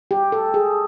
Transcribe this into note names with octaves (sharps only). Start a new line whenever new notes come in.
G4
A4
G#4